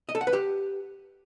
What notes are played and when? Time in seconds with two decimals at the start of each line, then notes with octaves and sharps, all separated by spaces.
0.09 D#5
0.15 A4
0.21 F#5
0.27 B4
0.33 G4